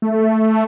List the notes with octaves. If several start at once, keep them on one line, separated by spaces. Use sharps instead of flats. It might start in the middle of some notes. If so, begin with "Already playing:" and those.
A3